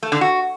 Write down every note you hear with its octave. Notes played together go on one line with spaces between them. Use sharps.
A3
D3
F#4